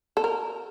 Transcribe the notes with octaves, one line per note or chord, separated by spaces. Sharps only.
A4
A#4